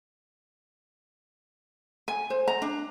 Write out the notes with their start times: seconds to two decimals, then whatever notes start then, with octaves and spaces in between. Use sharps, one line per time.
2.08 G#5
2.30 C5
2.48 A#5
2.62 D4